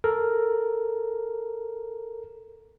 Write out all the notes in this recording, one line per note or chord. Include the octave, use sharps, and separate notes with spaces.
A4 A#4